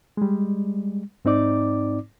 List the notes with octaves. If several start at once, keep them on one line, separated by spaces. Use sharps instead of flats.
G3 G#3
G#2 C4 D#4 D5 D6